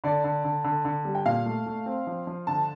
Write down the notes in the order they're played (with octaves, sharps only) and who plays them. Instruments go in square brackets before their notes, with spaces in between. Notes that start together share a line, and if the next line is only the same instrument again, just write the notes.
[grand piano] D3 [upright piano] D5
[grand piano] D3
D3
D3
D3
G3
[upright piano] G5
[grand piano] A#2 [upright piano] F5
[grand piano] A3
A3
C4
F3
F3
[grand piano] D3 [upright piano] A5